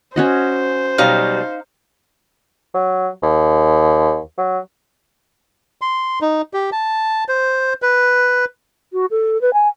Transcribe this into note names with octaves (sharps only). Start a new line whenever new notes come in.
C#4 F#4 C5 D#5
B2 F#3 G3 D#4 F5
F#3
D#2
F#3
C6
D#4
G4
A5
C5
B4
F#4
A4
B4
G#5